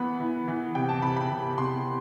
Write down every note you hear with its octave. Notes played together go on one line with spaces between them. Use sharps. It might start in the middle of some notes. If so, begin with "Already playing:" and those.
Already playing: E3 B3 B5
E3
E3
C3 G5
A5
C3 B5
B5
C3
C3 C6